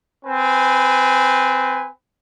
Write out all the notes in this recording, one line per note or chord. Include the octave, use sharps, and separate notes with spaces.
C4 B4 G#5